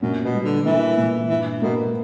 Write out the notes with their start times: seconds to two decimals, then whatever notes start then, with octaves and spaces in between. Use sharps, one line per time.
0.02 F#2 A#2
0.24 B2
0.33 G3
0.45 D3
0.65 E3 A#3
0.98 A#2
1.29 G2 E3
1.62 B2 A#3
1.77 A#2